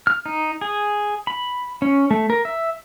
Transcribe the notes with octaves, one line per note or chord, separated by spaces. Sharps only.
F6
D#4
G#4
B5
C#4
A3
A#4
E5